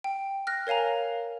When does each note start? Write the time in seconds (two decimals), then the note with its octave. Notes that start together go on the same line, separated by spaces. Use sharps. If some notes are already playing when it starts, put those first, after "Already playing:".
0.04 G5
0.47 F6 F#6 A#6
0.67 A#4 C#5 F5 G#5 A#5